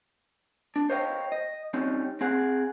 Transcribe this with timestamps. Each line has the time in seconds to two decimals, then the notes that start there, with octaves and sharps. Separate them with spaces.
0.76 D4
0.90 C5 C#5 D#5 F5 G5
1.32 D#5
1.74 G3 C4 C#4 D#4
2.21 C4 G#4 F#5